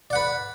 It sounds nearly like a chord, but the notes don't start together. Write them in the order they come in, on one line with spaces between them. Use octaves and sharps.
D5 F#5 B4